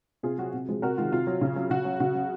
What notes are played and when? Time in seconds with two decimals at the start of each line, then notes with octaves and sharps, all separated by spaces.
0.23 C3 F4 G#4
0.38 F#3 F#4
0.53 C3
0.69 F3 G#3
0.82 C3 F#4 A#4
0.98 D#3 G#3 F4
1.12 C3 F4
1.27 F#3
1.41 C#3
1.56 F#3
1.70 C#3 F#4
1.85 F#3
2.00 C#3 F#4
2.15 F#3